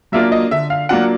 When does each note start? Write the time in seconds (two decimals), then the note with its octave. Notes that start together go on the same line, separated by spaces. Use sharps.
0.12 F#3 A#3 D4 F4 E5
0.32 D#5
0.51 D3 E5
0.70 F5
0.89 F#3 A#3 D4 F4 F#5